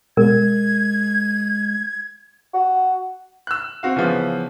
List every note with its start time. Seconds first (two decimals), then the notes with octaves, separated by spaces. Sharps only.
0.17 B2 G#3 A#4 G#6
2.54 F#4
3.47 E6 F#6
3.83 C4 F#4 F5
3.96 C#3 E3 F3 B3